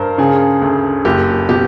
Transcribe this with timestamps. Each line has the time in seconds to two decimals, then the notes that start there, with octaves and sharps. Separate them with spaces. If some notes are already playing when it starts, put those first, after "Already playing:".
Already playing: G2 A#4 C5
0.18 C#3 G#4
0.62 D2
1.05 F#1 G4
1.49 B2 G4